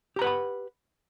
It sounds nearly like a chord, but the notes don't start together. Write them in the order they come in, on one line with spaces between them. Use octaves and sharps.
G4 A#5 B4 F#5 B5